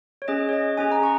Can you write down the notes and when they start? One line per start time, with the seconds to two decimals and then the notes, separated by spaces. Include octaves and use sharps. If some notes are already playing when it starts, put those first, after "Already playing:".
0.22 C#5
0.28 C#4 G#4 D#5
0.49 C#5
0.53 D#5
0.77 C#4 G#4 G#5
0.92 A#5
1.03 C#6